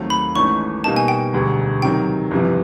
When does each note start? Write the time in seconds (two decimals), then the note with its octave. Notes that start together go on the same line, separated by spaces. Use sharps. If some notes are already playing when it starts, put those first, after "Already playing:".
Already playing: D#2 D#3 F#3 A3 C4
0.10 B5
0.35 G#1 G#2 E3 A3 C#4 C#6
0.84 B2 G3 A#3 D#4 A5
0.96 G#5
1.08 G5
1.33 E1 D2 D3 G3
1.82 C3 D#3 F#3 G5
2.31 G1 F2 C3 E3